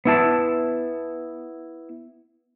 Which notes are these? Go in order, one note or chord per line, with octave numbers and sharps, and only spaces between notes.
B3 E4 A5